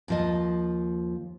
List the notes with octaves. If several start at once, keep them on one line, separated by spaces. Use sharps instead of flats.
D#2 F3 D#5